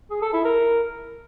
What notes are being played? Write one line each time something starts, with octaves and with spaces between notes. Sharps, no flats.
G#4
A4
E4
A#4